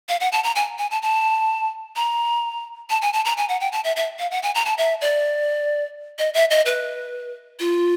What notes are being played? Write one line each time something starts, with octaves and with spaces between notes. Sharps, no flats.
F5
F#5
A5
A#5
G#5
G#5
A5
A5
A#5
A5
G#5
A5
A#5
G#5
F#5
G5
A5
E5
E5
F5
F#5
G#5
A#5
A5
E5
D5
D#5
E5
D#5
B4
F4